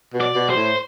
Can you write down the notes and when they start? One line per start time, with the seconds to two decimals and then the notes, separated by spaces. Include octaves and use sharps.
0.14 B2
0.21 D5
0.35 B2
0.50 C5
0.56 A2